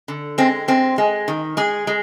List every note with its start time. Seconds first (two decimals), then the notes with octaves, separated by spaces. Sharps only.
0.08 D3
0.38 G#3 C4
0.68 G#3 C4
0.98 G#3
1.28 D#3
1.57 G#3 G#4
1.87 G#3